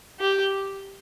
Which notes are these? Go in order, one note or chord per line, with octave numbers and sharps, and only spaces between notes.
G4